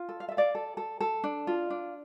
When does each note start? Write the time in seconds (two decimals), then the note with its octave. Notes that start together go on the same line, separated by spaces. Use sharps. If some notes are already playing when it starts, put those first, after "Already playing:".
Already playing: F4
0.09 A4
0.20 F5
0.29 A4 E5
0.37 D5 F5
0.55 A4
0.77 A4
1.00 A4
1.24 D4
1.47 F4
1.70 D4